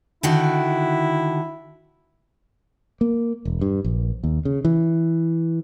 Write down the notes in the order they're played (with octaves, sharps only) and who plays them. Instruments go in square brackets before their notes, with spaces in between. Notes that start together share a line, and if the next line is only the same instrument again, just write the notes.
[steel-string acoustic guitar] D3 D#3 F#4 [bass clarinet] E4
[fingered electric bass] A#3
E1
G2
A#1
D#2
C#3
E3